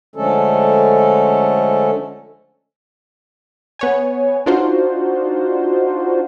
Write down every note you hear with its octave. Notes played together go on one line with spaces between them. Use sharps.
D3 F3 G#3 A3 C#4 A4
B3 C#5 G#5
D4 D#4 F4 F#4 C5